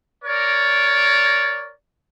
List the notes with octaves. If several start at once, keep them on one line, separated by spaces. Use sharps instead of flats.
A#4 C#5 D5